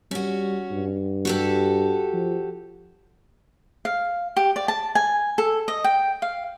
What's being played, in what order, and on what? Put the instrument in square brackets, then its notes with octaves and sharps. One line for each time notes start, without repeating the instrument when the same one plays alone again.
[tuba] G3 [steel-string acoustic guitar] C#4 F#4
[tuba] G2
[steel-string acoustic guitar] F#4 G4 A4
[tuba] F3
[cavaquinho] F5
G4
D5
A5
G#5
A4
D#5
G5
F5